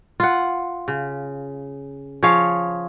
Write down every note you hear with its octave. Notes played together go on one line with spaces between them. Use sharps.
F4 F#5
C#3
F3 G#4 C#5 F5